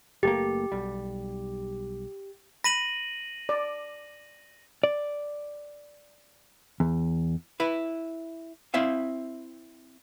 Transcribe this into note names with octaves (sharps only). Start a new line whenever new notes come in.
F#1 A3 A#3 G4
B1 G3
B5 A#6 D#7 F#7
D5
D5
E2
E4 B4
C4 E4 E5 F5